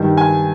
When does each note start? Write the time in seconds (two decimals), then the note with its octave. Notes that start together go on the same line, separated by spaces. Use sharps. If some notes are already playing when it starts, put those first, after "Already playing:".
Already playing: G2 D#3 G3
0.17 G#5